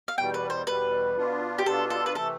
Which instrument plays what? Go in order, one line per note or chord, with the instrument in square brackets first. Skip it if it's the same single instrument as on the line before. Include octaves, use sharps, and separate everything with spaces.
[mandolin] F5
[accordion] E2 B2 G3 [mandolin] G5
[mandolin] B4
C5
[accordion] E2 B2 G3 [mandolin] B4
[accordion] B2 B3 D4 F4
[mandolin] G4
[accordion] B2 B3 D4 F4 [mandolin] A4
[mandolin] A4
B4
[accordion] C3 E3 A3 [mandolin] A4